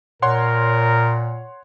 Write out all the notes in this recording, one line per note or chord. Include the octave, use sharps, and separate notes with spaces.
A#2 A#4 C#5 F#5 C6